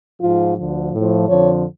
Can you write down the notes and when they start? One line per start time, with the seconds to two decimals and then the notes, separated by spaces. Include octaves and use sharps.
0.20 G#2 F3 F4
0.56 D2 D3 F3
0.92 A2
0.97 F3
1.28 F2 D3 F3 C#5